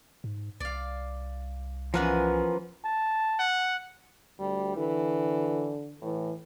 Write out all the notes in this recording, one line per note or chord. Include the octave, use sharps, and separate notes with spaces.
G#2
C2 D5 F5
E3 F3 B3 C#4 A#4 F#5
A5
F#5
D2 G3
D3 E3
A2 E3